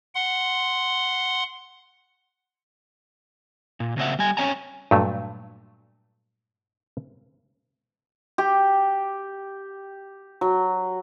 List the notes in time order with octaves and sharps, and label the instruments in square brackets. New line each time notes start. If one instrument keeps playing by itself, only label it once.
[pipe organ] F#5 C6
[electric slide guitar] A#2
C#3 A#3 C4 C5 E5 F#5
G3 G#5
C4 C#4 C#5 G#5 A#5
[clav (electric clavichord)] G2 A#2 F#3 A3
[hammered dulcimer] G4
F#3